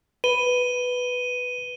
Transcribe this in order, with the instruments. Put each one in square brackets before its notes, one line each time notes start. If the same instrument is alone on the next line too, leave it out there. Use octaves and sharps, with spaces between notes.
[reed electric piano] B4 [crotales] D#7 G7